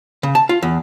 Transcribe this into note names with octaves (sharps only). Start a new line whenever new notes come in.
C#3
A5
F4
E2